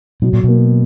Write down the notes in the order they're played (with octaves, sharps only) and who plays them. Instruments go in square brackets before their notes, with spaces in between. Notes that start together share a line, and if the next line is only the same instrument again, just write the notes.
[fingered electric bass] B2 [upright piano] F#3
[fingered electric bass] A#2
[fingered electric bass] B2 [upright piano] A#3